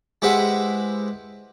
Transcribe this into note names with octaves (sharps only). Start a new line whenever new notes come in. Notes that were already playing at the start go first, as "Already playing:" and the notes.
G#3 E4 G4 B4 C5 F#5